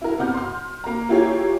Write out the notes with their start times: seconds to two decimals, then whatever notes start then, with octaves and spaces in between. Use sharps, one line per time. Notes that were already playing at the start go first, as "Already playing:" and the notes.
0.02 E4 A#4
0.18 C3 B3 F6 G6
0.34 C6 F6
0.84 A#3 A#5
1.09 A#3 E4 F4 G4 G#4 C#5